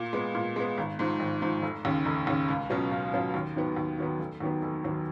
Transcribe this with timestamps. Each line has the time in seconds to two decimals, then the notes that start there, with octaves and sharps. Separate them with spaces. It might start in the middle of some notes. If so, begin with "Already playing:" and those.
Already playing: A#2
0.13 G#3 B3
0.35 A#2
0.56 G#3 B3
0.78 G#1
0.99 G#2 F3
1.20 G#1
1.42 G#2 F3
1.62 F1
1.85 D#2 C#3
2.05 F1
2.27 D#2 C#3
2.48 C#2
2.70 B2 F#3 C#4 F4
2.91 C#2
3.13 B2 F#3 C#4 F4
3.34 D#2
3.56 D#3 F#3 B3
3.77 D#2
3.98 D#3 F#3 B3
4.19 F1
4.40 D#2 D#3 F#3 B3
4.62 F1
4.84 D#2 D#3 F#3 B3